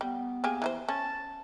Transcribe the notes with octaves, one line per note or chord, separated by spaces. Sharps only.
G3 B3
A#3 G4 G#4
E3 D#4 C5
C#4 A5